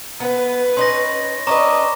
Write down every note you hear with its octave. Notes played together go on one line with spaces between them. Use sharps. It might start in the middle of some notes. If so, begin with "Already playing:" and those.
B3 B4
C#4 D#4 C6 A#6
C#4 D4 B4 D#5 A#5 D6